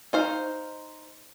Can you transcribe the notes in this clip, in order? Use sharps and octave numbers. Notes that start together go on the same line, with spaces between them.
D#4 C5 F5